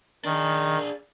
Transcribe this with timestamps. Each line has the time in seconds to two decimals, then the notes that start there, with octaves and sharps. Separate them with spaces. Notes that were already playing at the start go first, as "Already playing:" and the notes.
0.25 D#3 D4 G#4